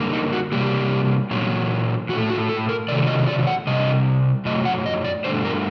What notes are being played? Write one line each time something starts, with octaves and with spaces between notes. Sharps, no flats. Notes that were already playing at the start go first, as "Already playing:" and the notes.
Already playing: F#2 D3 G3 A#3
D#4
F#4
C3 G3 A#3 G4
A#2 F#3 A#3
A2 A3 F#4
F#4
A4
A#4
C3 D#3 F#3 A3 D5
D#5
D5
F#5
C3 G3 D#5
F#2 F#3 A3 D#5
F#5
D#5
D5
G2 D3 A3 C5
A#4